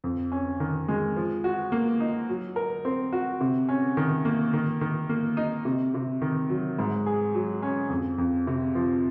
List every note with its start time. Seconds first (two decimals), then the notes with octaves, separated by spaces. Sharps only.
0.04 F2
0.32 C#4
0.60 D#3
0.88 G#3
1.16 F3
1.44 F#4
1.72 A#3
2.00 D#4
2.29 F#3
2.56 A#4
2.85 C4
3.13 F#4
3.41 C3
3.69 C#4
3.97 D#3
4.25 A#3
4.53 D#3
4.81 D#3
5.09 A#3
5.37 D#4
5.65 C3
5.94 C3
6.22 D#3
6.49 F#3
6.79 G#2
7.06 G#4
7.34 F#3
7.62 C#4
7.90 F2
8.18 F2
8.47 C3
8.75 F3